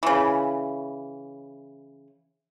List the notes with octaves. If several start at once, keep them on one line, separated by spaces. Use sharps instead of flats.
C#3 E3